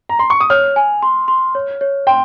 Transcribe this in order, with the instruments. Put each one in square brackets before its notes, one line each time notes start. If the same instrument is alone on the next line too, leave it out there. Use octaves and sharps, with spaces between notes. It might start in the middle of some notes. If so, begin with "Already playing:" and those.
[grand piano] A#5
C6
C#6
D#6
[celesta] C#5 [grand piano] F6
[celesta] G#5
C6
C6
C#5
C#5
[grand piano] G5 [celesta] C6